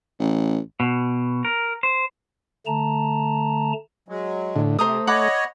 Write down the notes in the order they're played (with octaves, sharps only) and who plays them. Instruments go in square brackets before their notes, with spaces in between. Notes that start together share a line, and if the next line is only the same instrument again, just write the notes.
[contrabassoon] A1
[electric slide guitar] B2
A#4
C5
[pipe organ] D3 A3 A5 A#5
[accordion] F#3 G#3
[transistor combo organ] A2 D3
[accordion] C3 [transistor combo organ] A3 [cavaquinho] C5 A#5 D#6
[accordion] C#5 D#5 [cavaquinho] F#5 B5 D6